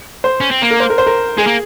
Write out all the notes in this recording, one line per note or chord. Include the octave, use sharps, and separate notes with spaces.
C5
C#4
C4
A#3
A#4
C5
A#4
C5
A#4
G#3 G#4
A#3